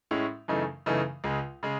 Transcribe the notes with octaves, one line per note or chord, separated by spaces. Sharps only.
A2 G#3 C#4 E4
F#2 C#3 E3 A3 D#4
F#2 C#3 E3 A3 D#4
C#2 C#3 G#3
C#3 G#3